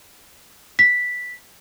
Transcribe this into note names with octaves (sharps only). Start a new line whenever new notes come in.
B6